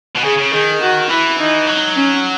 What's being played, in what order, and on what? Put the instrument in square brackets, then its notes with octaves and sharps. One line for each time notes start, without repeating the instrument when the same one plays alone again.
[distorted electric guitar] B2
[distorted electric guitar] C#3 [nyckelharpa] G#4
[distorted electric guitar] C#3
[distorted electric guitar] D#3 [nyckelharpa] G#4
[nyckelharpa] F#4
[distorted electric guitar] E3 [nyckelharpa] E4
[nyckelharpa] D#4
[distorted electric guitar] F#3
[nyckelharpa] C#4